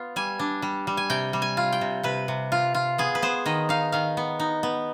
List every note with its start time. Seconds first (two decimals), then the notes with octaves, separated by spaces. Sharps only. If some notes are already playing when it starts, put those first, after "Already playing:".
Already playing: B3 F4
0.16 G3 G#5
0.39 D4
0.62 G3
0.87 G3
0.97 G#5
1.10 C3 G5
1.33 G3
1.42 G#5
1.57 F4
1.72 G5
1.81 C3
2.03 C3 B4
2.28 C3
2.52 F4
2.74 F4
2.98 B3 G#4
3.15 B4
3.22 B3 C5
3.46 D#3 D#5
3.69 D#4 F5
3.92 D#3 F5
4.17 B3
4.40 D#4
4.63 B3